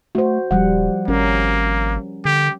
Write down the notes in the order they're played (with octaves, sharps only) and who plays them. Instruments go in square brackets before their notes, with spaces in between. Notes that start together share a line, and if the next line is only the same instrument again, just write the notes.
[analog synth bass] A3 [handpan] F#4 C5
[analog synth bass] D#1 [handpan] F3 G3 F#5
[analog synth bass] G#1 [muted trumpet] A#3 [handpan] C#4 A#4
[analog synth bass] D3 [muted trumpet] G4